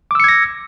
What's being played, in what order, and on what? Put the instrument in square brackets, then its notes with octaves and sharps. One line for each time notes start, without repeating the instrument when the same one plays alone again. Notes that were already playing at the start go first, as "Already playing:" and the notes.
[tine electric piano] D6
E6
C#7
G#6
A#6